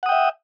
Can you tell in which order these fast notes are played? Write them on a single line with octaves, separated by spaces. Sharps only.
F#5 D#6 G5 E5